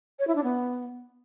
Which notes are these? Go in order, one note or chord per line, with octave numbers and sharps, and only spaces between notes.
C#5
E4
D4
B3